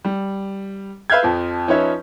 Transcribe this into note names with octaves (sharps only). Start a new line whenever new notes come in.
G3
B4 E5 F5 F6 G6 G#6
F2 F3
F3 C#4 D#4 B4 C#5 E5